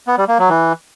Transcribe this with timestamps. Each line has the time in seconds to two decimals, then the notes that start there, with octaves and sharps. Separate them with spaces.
0.07 B3
0.18 G3
0.28 A#3
0.39 F#3
0.49 E3